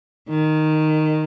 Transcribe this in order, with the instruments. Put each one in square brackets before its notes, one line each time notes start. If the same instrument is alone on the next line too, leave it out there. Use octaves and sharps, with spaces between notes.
[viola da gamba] D#3